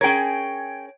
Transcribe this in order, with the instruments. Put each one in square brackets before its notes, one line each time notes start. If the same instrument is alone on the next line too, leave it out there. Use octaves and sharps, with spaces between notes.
[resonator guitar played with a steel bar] C#4 G#4 A#4 [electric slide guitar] C#5 G5